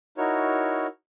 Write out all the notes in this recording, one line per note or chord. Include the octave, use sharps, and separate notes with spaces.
D#4 E4 F#4 A#4 C#5